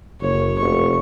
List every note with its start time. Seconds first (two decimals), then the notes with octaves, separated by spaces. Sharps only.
0.20 F#1 C#5
0.59 F1 C#6